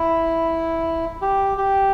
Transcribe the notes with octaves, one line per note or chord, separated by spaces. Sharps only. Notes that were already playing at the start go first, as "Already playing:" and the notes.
Already playing: E4
G4
G4